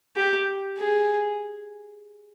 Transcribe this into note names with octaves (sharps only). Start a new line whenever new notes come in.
G4
G#4